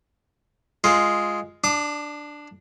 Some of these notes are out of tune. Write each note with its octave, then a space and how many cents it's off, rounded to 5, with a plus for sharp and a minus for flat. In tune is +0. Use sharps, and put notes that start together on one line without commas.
G#3 +0 F4 +0
D4 +5 D6 +45